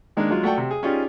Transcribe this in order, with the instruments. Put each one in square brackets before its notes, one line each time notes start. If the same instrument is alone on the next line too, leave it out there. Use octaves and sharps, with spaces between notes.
[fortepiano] D#3 G#3 A#3 D4
F#3 G#3 F4
A3 F#4 D5 F#5 G5 A5
C3
G#4
C#4 D#4 F4 G4 G#4 D5